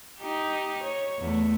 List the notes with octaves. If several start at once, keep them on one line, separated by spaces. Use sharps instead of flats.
D#4 G4
C#5
E2 A3